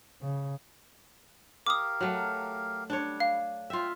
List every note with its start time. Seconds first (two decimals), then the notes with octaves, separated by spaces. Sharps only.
0.22 C#3
1.66 G4 A#4 F5 D6 D#6
2.01 F#3 A3
2.90 G3 D4 C#5
3.20 F5
3.70 F4 E5 G5